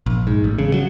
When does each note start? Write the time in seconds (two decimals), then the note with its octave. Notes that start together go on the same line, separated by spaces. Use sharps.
0.06 A#1
0.27 G#2
0.44 A1
0.58 C#3
0.74 F#3